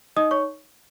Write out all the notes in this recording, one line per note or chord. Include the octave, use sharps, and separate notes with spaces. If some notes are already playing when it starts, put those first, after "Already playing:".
D#4 D#5 D#6
C#5 C#6